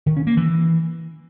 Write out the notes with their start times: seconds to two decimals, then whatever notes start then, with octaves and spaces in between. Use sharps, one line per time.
0.06 D#3
0.17 C#4
0.27 A#3
0.37 E3